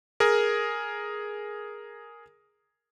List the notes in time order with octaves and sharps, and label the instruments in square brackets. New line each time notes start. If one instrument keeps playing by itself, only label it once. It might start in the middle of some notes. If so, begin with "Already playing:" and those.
[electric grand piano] G#4 A#4